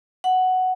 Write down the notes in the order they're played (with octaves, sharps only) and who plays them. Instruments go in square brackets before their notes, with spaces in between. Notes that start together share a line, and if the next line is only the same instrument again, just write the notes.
[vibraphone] F#5